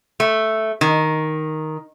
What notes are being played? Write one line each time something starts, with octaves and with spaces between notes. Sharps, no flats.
A3
D#3